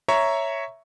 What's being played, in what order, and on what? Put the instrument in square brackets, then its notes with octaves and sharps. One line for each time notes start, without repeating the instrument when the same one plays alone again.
[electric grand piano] C#5 E5 A#5 C#6